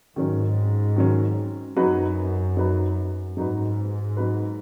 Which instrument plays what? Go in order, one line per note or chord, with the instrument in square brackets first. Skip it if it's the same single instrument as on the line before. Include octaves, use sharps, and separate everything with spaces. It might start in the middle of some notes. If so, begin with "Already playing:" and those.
[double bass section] G#2 [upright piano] D#3 F#3 C#4
[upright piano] D#3 F#3 C#4
[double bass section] F#2 [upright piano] F#3 D#4 F#4 B4
[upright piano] F#3 D#4 F#4 B4
[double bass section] G#2 [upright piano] F#3 D#4 F#4 B4
[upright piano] F#3 D#4 F#4 B4